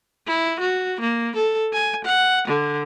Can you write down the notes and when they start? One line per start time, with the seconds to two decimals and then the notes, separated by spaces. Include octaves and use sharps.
0.27 E4
0.60 F#4
1.01 A#3
1.36 A4
1.73 G#5
2.05 F#5
2.48 D3